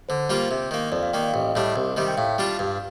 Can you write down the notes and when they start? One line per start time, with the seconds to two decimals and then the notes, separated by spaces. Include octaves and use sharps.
0.09 D3 C5
0.29 G3 A#3 F4
0.51 C3
0.71 D#3 A#3
0.92 F2 D5
1.03 F5
1.13 D#3 A#3 G5
1.23 F5
1.33 A1 D#5
1.55 A2 G3 D4
1.76 C2
1.97 C3 D#3 G3
2.08 G5
2.17 A2 F5
2.38 G3 D4 F4
2.59 G2